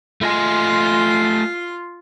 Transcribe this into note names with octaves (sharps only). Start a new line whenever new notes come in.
A3 F4 D#5 G#5 C6